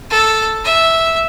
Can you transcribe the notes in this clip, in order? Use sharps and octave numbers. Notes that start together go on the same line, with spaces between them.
A4
E5